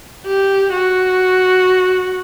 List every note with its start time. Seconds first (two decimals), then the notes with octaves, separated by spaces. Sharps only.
0.26 G4
0.72 F#4